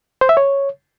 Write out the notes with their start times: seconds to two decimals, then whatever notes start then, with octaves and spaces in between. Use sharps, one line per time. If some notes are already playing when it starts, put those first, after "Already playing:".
0.21 C5
0.29 E5
0.37 C#5